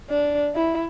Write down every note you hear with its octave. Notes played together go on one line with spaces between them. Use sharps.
D4
E4